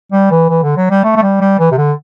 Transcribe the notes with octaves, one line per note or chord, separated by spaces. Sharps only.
G3
E3
E3
D3
F#3
G3
A3
A3
G3
G3
E3
C3
D3